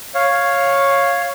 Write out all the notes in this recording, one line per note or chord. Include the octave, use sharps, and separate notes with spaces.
C#5 F5